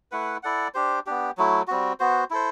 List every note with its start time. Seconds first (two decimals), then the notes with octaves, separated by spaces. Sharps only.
0.12 A3 E4 B4 F#5
0.43 E4 A4 D5 F#5
0.74 D4 G4 C5
1.06 B3 D4 G4
1.38 F#3 A3 E4
1.68 G3 C4 F#4
2.00 B3 F#4 C5
2.31 E4 A4 C5